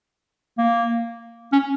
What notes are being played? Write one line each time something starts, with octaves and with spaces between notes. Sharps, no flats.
A#3
C#4